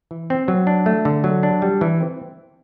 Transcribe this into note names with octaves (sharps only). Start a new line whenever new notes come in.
E3
C4
F#3
D4
A3
D3
F#3
D4
G3
E3
C4